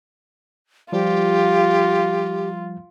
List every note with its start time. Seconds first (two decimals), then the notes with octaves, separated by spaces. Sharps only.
0.92 F3 G3 F4 G4